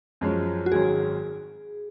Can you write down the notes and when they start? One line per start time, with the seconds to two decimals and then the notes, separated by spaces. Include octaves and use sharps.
0.21 F#2 F3 G#3 C#4
0.66 F#4
0.72 G#1 G#2 D#3 F#3 C#4 G#4